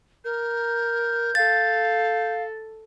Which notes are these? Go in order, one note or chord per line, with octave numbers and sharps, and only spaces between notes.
A#4 G6
A4 F5 A6